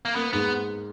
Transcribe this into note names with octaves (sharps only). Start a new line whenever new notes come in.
A#3
A#3 B3
G#2 B3